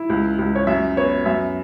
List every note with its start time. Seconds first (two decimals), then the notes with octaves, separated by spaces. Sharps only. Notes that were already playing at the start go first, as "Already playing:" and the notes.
Already playing: E4
0.10 C#2
0.39 C#2
0.55 C#5
0.67 F#2 E5
0.97 B3 C#5
1.26 F#2 E5